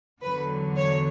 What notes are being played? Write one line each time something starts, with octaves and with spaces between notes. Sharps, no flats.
E2 D3 F#3 B4
C#5